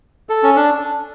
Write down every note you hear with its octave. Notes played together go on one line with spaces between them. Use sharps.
A4
C#4
D4